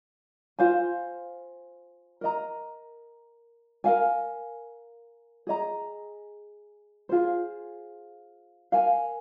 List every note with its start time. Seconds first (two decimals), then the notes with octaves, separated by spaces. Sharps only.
0.59 F4 C5 F5 G#5
2.21 A#4 D#5 A#5
3.84 A#4 F5 G#5
5.47 G#4 D#5 A#5
7.09 F4 G#4 C5
8.72 A#4 F5 G#5